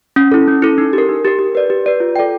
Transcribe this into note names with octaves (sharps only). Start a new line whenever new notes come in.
C#4
E4 A4
C#4
E4 A4
D#4
G4
A#4
D#4
G4 A#4
G4
B4 D5
G4
B4 D5
F4
A4 D5 G5